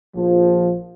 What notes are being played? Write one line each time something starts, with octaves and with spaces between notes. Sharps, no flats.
A#1 F3